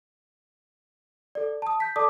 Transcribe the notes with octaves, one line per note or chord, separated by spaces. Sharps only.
A4 D5
A5 D#6
G6 B6
A4 D5 A5 D6 D#6